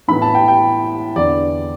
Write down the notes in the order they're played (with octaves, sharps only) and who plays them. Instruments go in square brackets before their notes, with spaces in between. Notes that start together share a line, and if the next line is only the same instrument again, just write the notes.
[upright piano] A2 E3 B3 B5
A5
G5
G5
E2 D3 B3 D5